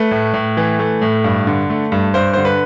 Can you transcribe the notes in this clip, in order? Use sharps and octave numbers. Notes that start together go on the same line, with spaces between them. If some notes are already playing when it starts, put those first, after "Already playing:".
Already playing: A3 B4
A2
A2
E3
A3
A2
G2
D3
A3
G2
G2 C5
D3 C5
B4